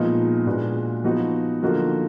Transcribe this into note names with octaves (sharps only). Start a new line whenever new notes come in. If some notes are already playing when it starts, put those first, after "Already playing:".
Already playing: A#2 F3 G#3 B3 D#4
A#2 G#3 D4 F#4 B4
F3 B3 D#4 F#4
D3 F3 A#3 D#4 F#4